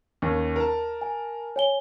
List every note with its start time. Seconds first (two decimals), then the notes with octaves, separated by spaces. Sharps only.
0.22 D#2 D#3 C#4
0.56 A#4 A5
1.02 G#5
1.56 C#5 G#5 G7